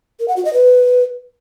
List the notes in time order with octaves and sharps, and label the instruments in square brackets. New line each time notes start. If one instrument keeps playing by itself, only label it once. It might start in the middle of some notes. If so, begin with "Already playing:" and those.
[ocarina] A#4
F#5
F#4
D#5
B4